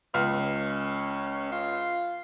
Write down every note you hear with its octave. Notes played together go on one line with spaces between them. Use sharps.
C#2 B3 F5 F6
C#4
F4